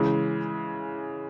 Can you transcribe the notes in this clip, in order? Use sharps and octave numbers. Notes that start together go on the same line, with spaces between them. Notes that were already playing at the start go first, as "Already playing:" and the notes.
Already playing: C#3 E3 G#3